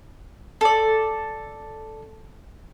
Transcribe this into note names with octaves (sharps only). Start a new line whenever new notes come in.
A4 D5